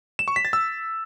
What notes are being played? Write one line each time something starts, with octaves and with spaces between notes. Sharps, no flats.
E7
C#6
B6
A6
E6